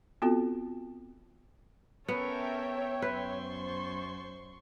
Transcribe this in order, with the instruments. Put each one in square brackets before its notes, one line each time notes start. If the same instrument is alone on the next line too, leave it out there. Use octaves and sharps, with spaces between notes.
[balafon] B3 C4 F4 F#4 A4
[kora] B3 [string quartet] C#4 A4 A#4 [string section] C#5 E5 G5
[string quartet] F#2 C6 C#6 [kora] B4
[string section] C5